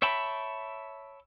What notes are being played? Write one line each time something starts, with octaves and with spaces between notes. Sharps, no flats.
C#5 E5 G5 A5 B5